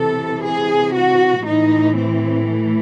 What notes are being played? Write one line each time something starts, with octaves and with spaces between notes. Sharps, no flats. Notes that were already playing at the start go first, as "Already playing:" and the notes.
Already playing: C3 E3 A4
G#4
F#4
A2 E3 D#4
C4
A3